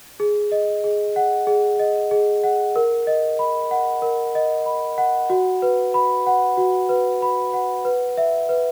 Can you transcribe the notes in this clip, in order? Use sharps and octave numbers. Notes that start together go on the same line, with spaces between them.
G#4
D#5
G#4
F#5
G#4
D#5
G#4
F#5
A#4
D#5
B5
F#5
A#4
D#5
B5
F#5
F#4
B4
B5
F#5
F#4
B4
B5
F#5
B4
E5
B4